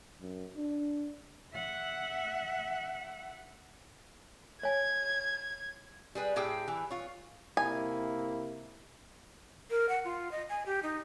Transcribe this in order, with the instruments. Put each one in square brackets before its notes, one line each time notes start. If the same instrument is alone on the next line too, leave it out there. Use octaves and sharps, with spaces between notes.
[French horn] F#2
D4
[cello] E5 F#5
[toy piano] C#5 G#5 [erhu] G#6
[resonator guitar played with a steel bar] G3 G#4 B4
A2 G4 G#4 G5
E3
F4 C#5
[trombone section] C3 A#3 E4 [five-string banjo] G#5
[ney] A#4
F#5
F4
D#5
G#5
G4
D#4